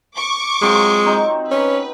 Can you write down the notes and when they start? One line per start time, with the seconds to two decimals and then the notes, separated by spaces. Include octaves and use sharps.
0.17 C#6 D6
0.62 F#3 G#3 C4 F4
1.06 F#3 C4 D#4
1.51 C#4 B4